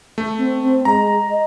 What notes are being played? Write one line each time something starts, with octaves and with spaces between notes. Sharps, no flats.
A3
C4
C4
G#3 A#5
D#5